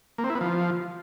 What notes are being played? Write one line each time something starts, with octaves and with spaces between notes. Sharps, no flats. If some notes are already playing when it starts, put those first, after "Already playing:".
A#3
C4
E4
B3
F3